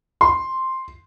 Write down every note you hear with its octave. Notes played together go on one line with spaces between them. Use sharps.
C6